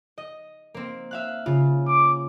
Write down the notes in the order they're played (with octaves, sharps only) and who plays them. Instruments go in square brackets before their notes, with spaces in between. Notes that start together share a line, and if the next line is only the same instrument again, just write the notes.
[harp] D#5
A#3 C4
E5 F5 F#6
C#3 F4
[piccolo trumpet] D6